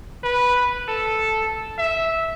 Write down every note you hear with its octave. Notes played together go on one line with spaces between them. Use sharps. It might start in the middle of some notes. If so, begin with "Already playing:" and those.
B4
A4
E5